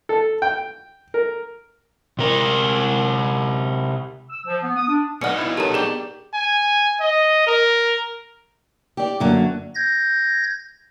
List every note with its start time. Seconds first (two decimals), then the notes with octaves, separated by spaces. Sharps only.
0.09 A4
0.42 G5
1.14 A#4
2.19 C3 A#4
4.30 E6
4.46 F3
4.63 B3
4.76 D#6
4.88 D4
5.21 B2 D#4 G#4 D5 F#5 F6 C#7
5.38 E4 F4
5.57 C#4 G4 A4 A#4 A#5
5.74 D4 G4 G#4 D5 G7
6.34 G#5
7.00 D#5
7.47 A#4
8.97 G4 D5
9.20 F#2 D3 F#3 A3 A#3
9.75 G6 G#6 A#6